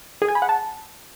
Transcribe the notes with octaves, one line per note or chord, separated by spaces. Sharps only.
G#4
G#5
B5
F#5
A5